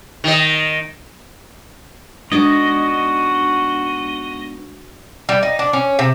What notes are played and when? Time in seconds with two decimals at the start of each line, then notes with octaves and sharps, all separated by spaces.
0.24 D#3 D#5
2.32 G#3 B3 D4 D#4 F#4 D5 D#5
5.29 G3
5.43 D#4
5.59 D4
5.73 C#4
5.99 C3